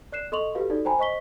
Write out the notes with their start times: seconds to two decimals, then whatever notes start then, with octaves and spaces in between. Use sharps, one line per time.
0.12 D5 F#6 C7 E7
0.32 A4 D#5 C6 C#6 F7 F#7
0.55 F#4 G4 A4 B4 F5
0.70 D#4 F#4 A4 D5
0.85 C5 G5 G#5 A#5 B5
0.99 C5 D#5 C#6 B6 G7